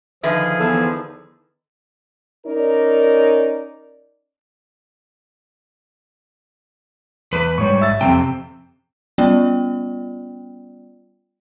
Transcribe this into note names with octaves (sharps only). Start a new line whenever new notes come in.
D3 D#3 F3 G#4 B4 E5
E2 A4 E6
C#4 D#4 A#4 D5
E2 B4
G#2 G3 C#5 C#6
E5 E6 A6
F2 C3 C4 G5
G3 B3 C#4 F4 D5 G5